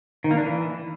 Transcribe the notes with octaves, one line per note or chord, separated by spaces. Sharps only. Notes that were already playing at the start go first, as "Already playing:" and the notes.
D#3
A#3
D4
E3